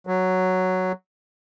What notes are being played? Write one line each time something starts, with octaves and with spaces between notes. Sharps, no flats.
F#3